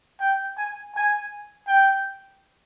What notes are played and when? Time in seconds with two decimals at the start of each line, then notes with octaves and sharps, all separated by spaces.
0.20 G5
0.57 G#5
0.95 G#5
1.68 G5